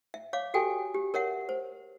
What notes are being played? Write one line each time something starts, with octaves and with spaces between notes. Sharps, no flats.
E5
C#5 F5 D6
F#4 G4 A4 G5 G#5
G4
A#4 C#5 E5 F#5
C5